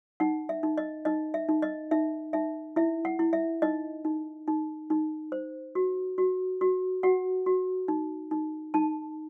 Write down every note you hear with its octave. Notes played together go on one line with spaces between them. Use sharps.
D#4 F#5
E5
D#4
D#5
D#4 D#5
E5
D#4
D#5
D#4 E5
D#4 E5
E4 E5
F#5
E4
E5
D#4 D#5
D#4
D#4
D#4
C5
F#4
F#4
F#4
F#4 F#5
F#4
D#4
D#4
D#4 A5